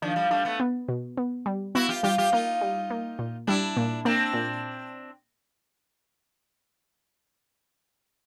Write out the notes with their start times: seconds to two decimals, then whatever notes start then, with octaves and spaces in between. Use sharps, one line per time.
0.02 D#3 F3 D4
0.16 F3 G3
0.31 G3 A3 D4
0.45 A3 B3
0.60 B3
0.88 B2
1.17 B3
1.46 G3
1.75 B3 E4 F#4
1.89 F4 G4
2.03 G3 F4 G4
2.18 F4 G4
2.32 A#3 D#4 F4
2.61 G3
2.90 A#3
3.19 A#2
3.47 G3 D4 E4
3.77 A#2
4.05 A#3 C4 D4
4.34 A#2